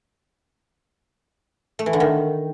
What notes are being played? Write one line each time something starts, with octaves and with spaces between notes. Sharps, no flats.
A3
E3
D3
D#3